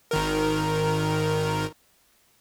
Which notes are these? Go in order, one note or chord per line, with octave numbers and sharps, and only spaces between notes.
G#1 D#3 A#4